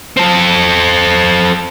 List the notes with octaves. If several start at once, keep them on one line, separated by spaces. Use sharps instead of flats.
C4 A4